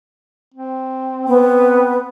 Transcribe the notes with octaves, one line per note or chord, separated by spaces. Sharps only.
C4
B3 C4